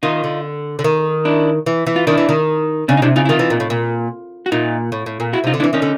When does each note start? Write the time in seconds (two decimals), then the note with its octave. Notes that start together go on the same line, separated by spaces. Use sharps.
0.03 D#3 D#4 F4
0.24 D3
0.79 D3
0.84 D#3
1.25 D4 E4
1.66 E3
1.86 E3
1.96 F4
2.07 D#3 D4 E4
2.18 E3
2.29 D#3
2.88 C#3 C4 D4
2.97 D#4
3.02 C3 D4 E4
3.16 C#3 D#4 F4
3.25 E4
3.29 D#3 D#4 F4
3.39 E3
3.50 A#2
3.60 A2
3.70 A#2
4.46 F#4
4.52 A#2 D#4 F4
4.92 A2
5.06 A2
5.20 A#2
5.33 E4 F#4
5.44 C3 D#4 F4
5.54 D3
5.60 D4 E4
5.64 E3
5.73 D#3 C#4 D#4
5.82 D3